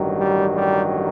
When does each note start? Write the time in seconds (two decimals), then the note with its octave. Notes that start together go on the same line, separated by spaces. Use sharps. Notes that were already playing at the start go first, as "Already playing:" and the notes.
Already playing: A1 G2 D#3 F#3
0.19 G3
0.56 G3